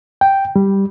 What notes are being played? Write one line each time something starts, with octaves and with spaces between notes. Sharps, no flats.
G5
G3